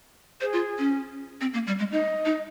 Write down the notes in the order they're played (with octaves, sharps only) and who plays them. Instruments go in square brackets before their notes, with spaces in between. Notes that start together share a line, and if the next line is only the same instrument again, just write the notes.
[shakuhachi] G#4 [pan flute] C5
[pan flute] F4
C#4
C4
A#3
G3
G#3
[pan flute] D#4 [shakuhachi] D#5
[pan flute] D#4